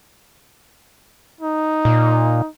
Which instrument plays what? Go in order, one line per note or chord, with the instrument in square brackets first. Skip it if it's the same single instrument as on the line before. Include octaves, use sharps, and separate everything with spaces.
[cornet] D#4
[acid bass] A#2